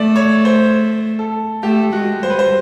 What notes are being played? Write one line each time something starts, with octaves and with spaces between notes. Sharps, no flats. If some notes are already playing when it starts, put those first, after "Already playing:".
Already playing: A3 D5
C#5
C5
A4
A3 G4
G#3 F#4
G3 C5
B4
C5